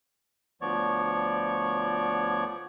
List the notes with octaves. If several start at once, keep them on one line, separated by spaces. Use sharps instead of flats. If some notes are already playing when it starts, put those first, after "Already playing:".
D2 F3 B3 C#5 D5 C#6